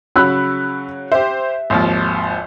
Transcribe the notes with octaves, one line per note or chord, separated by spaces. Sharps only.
C#3 F#3 B5 E6 F#6
G4 C5 E5
G#1 D#2 F3